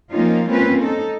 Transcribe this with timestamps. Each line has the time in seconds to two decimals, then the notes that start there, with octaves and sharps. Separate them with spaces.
0.11 F3 A#3 C4 C#4 D#4 F4
0.49 G#3 A#3 C4 C#4 F4 B4
0.82 D#4 A4